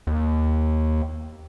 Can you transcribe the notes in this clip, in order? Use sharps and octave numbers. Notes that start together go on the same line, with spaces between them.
D#2